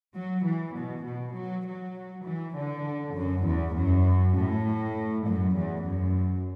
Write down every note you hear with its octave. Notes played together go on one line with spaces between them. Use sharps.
F#3
E3
B2
B2
F#3
F#3
E3
D3
F#2
E2
F#2
A2
F#2
E2
F#2